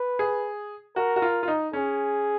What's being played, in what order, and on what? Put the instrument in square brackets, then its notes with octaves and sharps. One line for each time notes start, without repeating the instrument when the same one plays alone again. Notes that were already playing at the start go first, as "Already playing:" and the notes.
Already playing: [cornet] B4
[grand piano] G#4
[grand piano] F#4 [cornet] A#4
[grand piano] F#4
F4
F4
D#4
[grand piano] C#4 [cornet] G#4